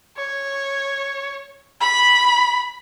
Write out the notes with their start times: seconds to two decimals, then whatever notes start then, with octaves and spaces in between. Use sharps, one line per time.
0.17 C#5
1.81 B5